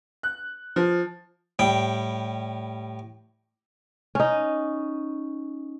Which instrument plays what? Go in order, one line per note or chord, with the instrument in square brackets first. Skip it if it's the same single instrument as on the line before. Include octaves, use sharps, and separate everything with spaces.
[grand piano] F#6
F3
[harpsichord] A2 G3 G5
[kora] C#4 D#4